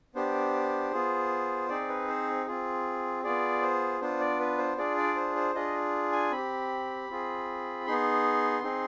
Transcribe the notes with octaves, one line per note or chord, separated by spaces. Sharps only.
B3 D4 G4 C5
B3 F4 G#4
C4 D#4 G#4 D5
B4
C5
C4 F4 G#4
B3 F4 G#4 D5
C5
B3 D4 F4 C5
D5
B4
C5
D4 F4 G#4 D5
D5
C5
C5
D4 F4 G#4 D#5
G#5
C4 G4 B5
C4 F4 G#4
B3 D#4 G#4 C6
C4 D#4 G#4